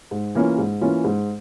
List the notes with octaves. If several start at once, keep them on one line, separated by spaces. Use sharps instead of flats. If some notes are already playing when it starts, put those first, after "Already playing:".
G#2
E3 A#3 C#4 F4
G#2
E3 A#3 C#4 F4
G#2